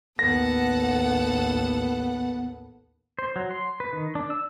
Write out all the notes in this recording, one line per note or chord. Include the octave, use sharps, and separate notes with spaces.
A1 D#2 B3 A4 F#5 A#6
C5
F#3
C6
B4
D#3
D4
E6